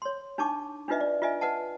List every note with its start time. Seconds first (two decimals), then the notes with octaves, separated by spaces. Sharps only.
0.02 C#5 C6
0.38 D4 D#4 A5 C#6 D6
0.88 D4 D#4 F4 B4 D#5 E5
1.00 D5
1.22 F4 B4 D#5 E5 G#5
1.41 B4 D#5 F#5 A5